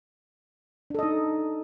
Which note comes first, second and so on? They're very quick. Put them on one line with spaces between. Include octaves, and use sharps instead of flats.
D4 A4 D#5 D#4